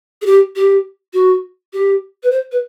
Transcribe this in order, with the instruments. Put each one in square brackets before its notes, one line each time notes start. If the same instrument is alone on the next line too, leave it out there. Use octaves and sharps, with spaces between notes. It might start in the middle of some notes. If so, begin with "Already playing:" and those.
[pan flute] G#4
G4
G4
F#4
G4
B4
C5
B4